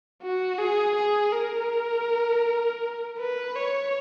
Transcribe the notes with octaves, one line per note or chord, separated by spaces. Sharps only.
F#4
G#4
G#4
A#4
B4
C#5